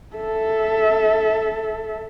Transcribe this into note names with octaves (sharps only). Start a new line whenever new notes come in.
A4 E5